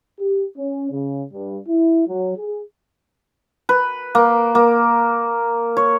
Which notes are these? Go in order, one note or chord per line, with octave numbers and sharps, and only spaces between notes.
G4
C#4
C#3
G2
E4
F#3
G#4
B4
A#3
A#3
C#5